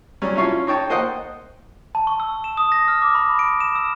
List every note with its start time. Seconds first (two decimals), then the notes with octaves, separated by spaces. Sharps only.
0.22 F#3 G3 C#4
0.36 C#4 E4 F4 C#5 F5 A5
0.67 D#4 C#5 G5 A5
0.90 A#3 C5 D#5 F#5 G5
1.95 A5
2.07 C#6
2.20 E6
2.44 E7
2.57 D#6
2.72 A#6
2.88 F6
3.02 D6
3.15 B5
3.39 D7
3.60 E7
3.75 E6